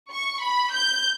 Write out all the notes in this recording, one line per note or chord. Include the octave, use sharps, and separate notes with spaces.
C#6
B5
G6